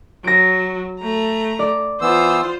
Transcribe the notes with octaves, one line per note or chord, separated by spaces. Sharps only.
F#3 A#6 D7
A3 A#5
D5
E3 B3 F4 C5 E6